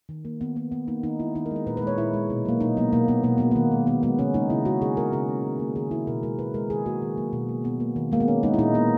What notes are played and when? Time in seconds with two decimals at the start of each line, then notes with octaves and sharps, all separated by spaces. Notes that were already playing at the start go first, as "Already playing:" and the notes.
0.09 D#3
0.25 A#3
0.41 D#3 B3
0.56 A#3 B3
0.72 D#3 B3
0.88 A#3 D#4
1.03 D#3 D#4
1.19 G#3 E4
1.35 D#3 D#4
1.46 A#4
1.51 G#3
1.56 A#4
1.67 A#2 B4
1.77 B4
1.82 G#3
1.87 C#5
1.98 A#2 E4
2.14 G#3
2.30 B2
2.45 F#3 A#3
2.60 B2 D#4
2.77 F#3 A#3 B3
2.93 B2 A#3
3.08 A#3 B3
3.23 B2 A#3
3.38 A#3 B3
3.51 D#3 A#3
3.72 G#3
3.86 D#3 B3
4.03 G#3 B3
4.18 C#3 C#4
4.34 G#3 D#4
4.50 C#3 E4
4.65 G#3 F#4
4.82 C#3 G#4
4.97 G#3 A#4
5.12 C#3 G#4
5.28 G#3
5.44 D#3
5.59 A#3
5.76 D#3 G#4
5.91 A#3 E4
6.07 B2 A#4
6.23 G#3 A#4
6.38 B2 B4
6.54 G#3 A#4
6.70 D#3 G#4
6.86 F#3 A#3 F#4
7.02 D#3
7.17 F#3 A#3
7.33 B2
7.49 A#3
7.64 B2 B3
7.80 A#3
7.96 D#3
8.12 G#3 A#3
8.20 B3
8.27 D#3 C#4
8.43 G#3 D#4
8.54 E4
8.58 A#2 D#4
8.74 A#3 B3